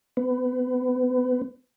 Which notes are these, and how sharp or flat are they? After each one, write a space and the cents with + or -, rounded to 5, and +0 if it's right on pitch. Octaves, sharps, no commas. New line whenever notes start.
B3 +30